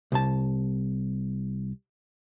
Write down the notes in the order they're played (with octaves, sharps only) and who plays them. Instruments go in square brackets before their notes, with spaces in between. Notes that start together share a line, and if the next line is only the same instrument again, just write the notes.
[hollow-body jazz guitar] C2 A5